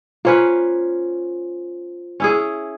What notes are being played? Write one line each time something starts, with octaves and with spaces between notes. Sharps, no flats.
A#3 C#4 F4 B4 C5
C#4 E4 G#4